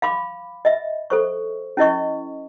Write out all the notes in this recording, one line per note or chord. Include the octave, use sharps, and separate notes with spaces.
F5 B5 C6 D6
D#5 E5
A4 C5 C#6
C#4 E4 D#5 C#6